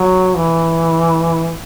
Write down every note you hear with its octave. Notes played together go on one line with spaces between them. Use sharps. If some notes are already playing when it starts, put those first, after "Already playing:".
Already playing: F#3
E3